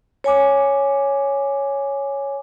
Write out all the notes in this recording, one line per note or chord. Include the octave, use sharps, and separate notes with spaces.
C#5 G#5 D6